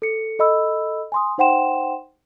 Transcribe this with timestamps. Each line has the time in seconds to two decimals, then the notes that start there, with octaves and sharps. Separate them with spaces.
0.02 A4 C#7
0.39 A4 D#5 B5 E6
1.12 G#5 C6 D#6
1.38 D#4 C5 F#5 G5 C6 E7